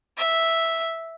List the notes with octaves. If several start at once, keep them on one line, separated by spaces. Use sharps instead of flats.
E5